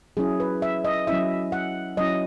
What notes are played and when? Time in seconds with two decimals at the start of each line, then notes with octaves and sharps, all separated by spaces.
0.17 F#3 C#4 E4 G#4
0.40 B4
0.62 E5
0.84 D#5
1.07 F#3 C#4 E4 E5
1.52 F#5
1.97 F#3 C#4 E4 D#5